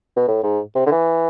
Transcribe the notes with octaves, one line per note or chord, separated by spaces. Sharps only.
B2
A2
G#2
C3
D3
E3